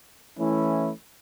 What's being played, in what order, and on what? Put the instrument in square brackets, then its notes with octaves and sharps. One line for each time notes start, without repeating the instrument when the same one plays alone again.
[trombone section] E3 A3 C#4 E4